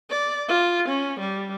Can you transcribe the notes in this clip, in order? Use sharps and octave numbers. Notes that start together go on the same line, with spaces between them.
D5
F4
C#4
G3